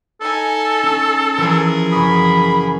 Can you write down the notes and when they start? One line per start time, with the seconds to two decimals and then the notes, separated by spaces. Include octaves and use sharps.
0.21 D#4 A4 G#5
0.83 C#4
1.38 E3 F3 G#4 A#4
1.92 F#1 B5 C#6 D#6